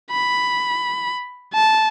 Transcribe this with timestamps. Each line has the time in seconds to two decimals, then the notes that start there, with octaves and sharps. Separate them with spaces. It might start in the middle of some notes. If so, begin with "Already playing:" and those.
0.11 B5
1.54 A5